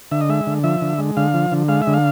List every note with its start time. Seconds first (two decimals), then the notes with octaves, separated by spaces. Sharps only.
0.11 D3 E5
0.21 D#5
0.29 G#3 E5
0.47 D3
0.64 F3 E5
0.81 D3
0.98 G#3
1.17 D3 F5
1.34 F3
1.52 D3
1.68 G#3 F5
1.82 E5
1.87 D3
1.93 F5